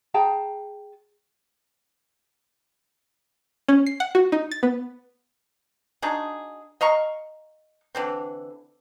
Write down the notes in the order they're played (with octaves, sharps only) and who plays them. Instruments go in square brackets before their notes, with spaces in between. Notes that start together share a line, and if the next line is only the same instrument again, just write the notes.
[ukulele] G#4 G5 A5 A#5
[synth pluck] C#4
C7
F#5
F#4
D#4
A6
B3
[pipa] D4 D#4 F#4 G#4
D#5 F5 A#5 C#6
D3 E3 C4